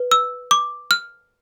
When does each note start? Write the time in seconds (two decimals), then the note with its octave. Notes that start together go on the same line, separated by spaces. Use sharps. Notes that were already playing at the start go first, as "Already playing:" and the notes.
Already playing: B4
0.11 E6
0.51 D6
0.91 F6